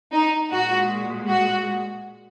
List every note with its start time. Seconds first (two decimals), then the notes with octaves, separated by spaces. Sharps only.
0.13 D#4
0.51 A#2 G#3 F#4
1.27 F#4